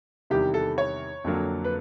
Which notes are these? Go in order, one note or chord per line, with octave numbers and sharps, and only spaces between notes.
E2 C3 D#3 G3 G4
A4
C#5
F2 D3 F#3 A#3
B4